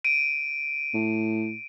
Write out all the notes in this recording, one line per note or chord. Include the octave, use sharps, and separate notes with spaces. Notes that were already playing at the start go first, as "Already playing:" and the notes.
D7 D#7
A2